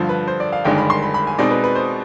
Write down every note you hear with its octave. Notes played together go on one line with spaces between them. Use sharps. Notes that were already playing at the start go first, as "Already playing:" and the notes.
Already playing: G2 D3 F3 C5
B4
C5
D5
F5
G1 G2 D#3 G#3 D4 G5
B5
C6
B5
B5
G#5
B2 G#3 C4 D#4 D5
B4
B4
C5